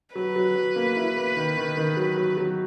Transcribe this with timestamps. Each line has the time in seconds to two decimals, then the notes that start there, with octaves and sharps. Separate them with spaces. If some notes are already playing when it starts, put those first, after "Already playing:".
0.15 F#3 B4
0.36 F#3
0.55 F#3
0.76 A#3
0.96 E4
1.16 A#3
1.36 D#3
1.57 D#3
1.77 D#3
1.97 F#3
2.17 F#3
2.37 F#3